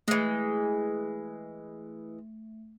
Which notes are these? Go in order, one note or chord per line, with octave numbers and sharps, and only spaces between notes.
E3 G#3 A3